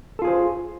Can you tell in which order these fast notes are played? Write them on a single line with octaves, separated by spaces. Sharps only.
A4 F4 G#4 C5